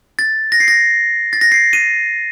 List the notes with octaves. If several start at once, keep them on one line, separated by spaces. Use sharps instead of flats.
A6
A#6
C7
A#6
A6
A#6
C7
D#7